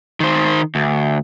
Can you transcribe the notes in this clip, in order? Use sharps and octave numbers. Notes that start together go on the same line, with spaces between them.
D#3 C5
D2